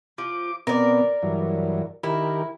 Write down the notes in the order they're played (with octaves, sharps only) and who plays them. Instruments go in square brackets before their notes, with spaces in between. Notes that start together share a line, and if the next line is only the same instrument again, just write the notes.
[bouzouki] F3 [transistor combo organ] D6
[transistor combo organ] B2 B3 C4 [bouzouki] A#4 D5
[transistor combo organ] G2 E3 F#3
[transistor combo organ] D#3 G4 A#4 [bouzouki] E4